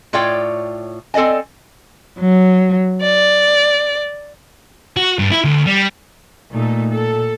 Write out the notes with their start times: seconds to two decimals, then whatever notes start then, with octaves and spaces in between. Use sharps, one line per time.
0.13 A2 F4 C#5 D5 G5
1.14 C4 A4 D5 D#5 G#5
2.19 F#3
3.02 D5
4.97 F#4
5.19 G2
5.31 E4
5.44 D2
5.67 G3
6.52 A#2 A3 D#4 A4
6.91 A4